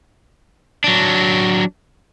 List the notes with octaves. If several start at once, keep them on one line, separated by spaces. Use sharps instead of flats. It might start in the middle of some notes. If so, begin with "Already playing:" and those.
F#3 D4